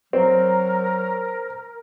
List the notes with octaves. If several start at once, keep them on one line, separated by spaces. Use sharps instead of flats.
F#3 C4 A#4